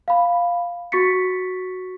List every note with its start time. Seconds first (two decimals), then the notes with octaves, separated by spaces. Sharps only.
0.08 F5 B5
0.92 F#4 C#6 A6 B6 C#7